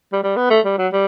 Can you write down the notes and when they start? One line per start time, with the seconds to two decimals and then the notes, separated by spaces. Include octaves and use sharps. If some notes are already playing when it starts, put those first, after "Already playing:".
0.12 G3
0.23 G3
0.36 B3
0.50 A3
0.65 G3
0.78 F#3
0.92 G3